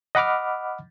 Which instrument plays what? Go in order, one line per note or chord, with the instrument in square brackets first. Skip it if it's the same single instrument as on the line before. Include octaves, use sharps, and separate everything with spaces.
[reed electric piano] D#5 F#5 B5 D6 F6